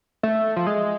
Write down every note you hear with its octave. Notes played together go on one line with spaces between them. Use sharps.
A3
F3
G#3